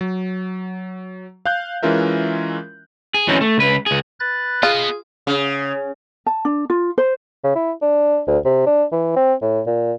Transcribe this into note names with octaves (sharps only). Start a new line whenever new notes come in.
F#3
F5 F#6 G6
E3 G#3 C#4 F4 A#4 E5
G#4
E3 F#3 C4 C#4 D#4
A3
C#2 B4
C#2 G#4
B4 F#6 A6
B3 F4 G#4 D#5
C#3
A5
D4
F4
C5
C#3
E4
D4
D2
C3
D4
E3
C4
A2
A#2